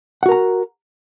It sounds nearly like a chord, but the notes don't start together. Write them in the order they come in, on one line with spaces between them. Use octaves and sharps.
F#5 F#4 A#4 A#5